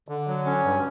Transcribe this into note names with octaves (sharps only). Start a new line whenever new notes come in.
D3
F#3
C#4
G2